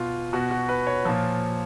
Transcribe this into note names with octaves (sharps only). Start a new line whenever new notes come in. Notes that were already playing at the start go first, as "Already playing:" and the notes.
Already playing: B2 F4
B2 F#4
F#4
B4
C#5
A#2 F3